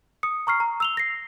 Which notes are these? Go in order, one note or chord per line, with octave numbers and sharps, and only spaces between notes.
D#6 C#7
A#5 C#6 F6 C7
A#5
E6 F7 G7
A#6 C7